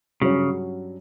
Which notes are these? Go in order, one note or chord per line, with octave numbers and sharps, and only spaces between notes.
G2 C#3 F#3 C#4 F#4 C#5